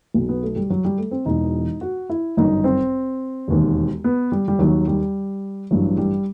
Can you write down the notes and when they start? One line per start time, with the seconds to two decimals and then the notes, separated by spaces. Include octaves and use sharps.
0.14 B1 B2
0.29 B3
0.43 A3
0.56 G3
0.70 F#3
0.85 G3
0.98 A3
1.11 C4
1.25 E1 E2 B2 D#4
1.81 F#4
2.10 E4
2.37 G1 F#2 D#3 D#4
2.64 C4
3.48 E1 D#2 D#3
4.04 B3
4.32 G3
4.48 G3
4.59 D#2 D#3 F#3
4.87 G3
5.71 A1 G2 E3 F#3
5.98 G3